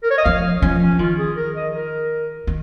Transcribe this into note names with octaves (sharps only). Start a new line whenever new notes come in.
A#4
C#5
D#5
F3 F5
F3 C#4
C#4
D#3 F4
G#4
A#4
D#5
A#4
D#3